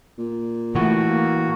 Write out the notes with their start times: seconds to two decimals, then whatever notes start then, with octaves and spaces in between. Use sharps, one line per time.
0.18 A#2
0.75 A2 E3 A3 F#4
1.09 A#3